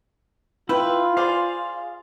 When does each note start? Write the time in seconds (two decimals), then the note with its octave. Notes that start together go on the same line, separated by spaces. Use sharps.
0.69 E4 F4 B4 G5
1.17 G#4 C5 D5 F5